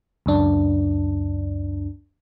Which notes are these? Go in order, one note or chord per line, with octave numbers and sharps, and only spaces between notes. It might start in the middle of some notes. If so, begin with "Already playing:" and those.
C#2 F#2 D4